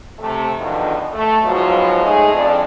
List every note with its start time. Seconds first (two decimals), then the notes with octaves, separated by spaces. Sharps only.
0.19 C3 A3
0.58 E2 B2 D3 D#3 F3
1.13 A3
1.43 G#2 B2 F3 F#3
2.02 G#3 A3 D#4 G#4
2.33 F2 D4